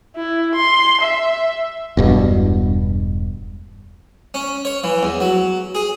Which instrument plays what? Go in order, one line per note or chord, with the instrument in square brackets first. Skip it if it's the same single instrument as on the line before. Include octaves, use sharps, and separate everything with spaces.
[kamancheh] E4
C6
E5
[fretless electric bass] E1 G2 B2
[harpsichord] C#4
C#5
E3
E2
F#3
G#4